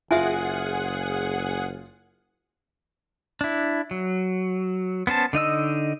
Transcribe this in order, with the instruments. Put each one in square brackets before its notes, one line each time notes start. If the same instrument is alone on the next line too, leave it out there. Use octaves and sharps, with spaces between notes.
[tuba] F#1 [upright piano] F4 [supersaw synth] G#4 F#5 [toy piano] E5 G#5
[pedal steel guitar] D4 E4
F#3
B3 C#4 C5 A5
D3 D#4 D#5 E6